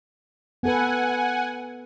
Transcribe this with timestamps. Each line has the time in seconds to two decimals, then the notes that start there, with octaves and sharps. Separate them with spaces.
0.63 B3 A4 B4 F#5 G#5